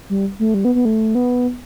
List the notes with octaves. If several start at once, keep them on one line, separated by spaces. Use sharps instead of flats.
G3
A3
G3
B3
B3
A3
B3